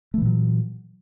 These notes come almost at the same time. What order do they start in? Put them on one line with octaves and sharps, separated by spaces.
A3 E3 A#2 F#3